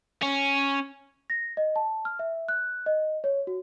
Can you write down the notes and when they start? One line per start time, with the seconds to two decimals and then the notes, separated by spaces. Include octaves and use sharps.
0.23 C#4
1.30 A#6
1.57 D#5
1.76 A5
2.05 F6
2.19 E5
2.49 F#6
2.86 D#5
3.24 C#5
3.47 F#4